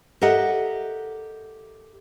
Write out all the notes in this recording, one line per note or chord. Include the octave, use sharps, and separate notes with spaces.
G4 A4 A#4 D#5 E5 F#5